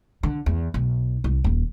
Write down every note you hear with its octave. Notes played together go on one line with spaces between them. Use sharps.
D3
E2
B1
C2
D#1